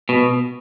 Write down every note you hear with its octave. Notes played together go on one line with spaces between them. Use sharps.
B2